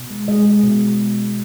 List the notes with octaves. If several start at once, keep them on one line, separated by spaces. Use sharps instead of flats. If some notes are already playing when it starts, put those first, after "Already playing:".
Already playing: B2
G#3
G#3 D#5
G#3
B2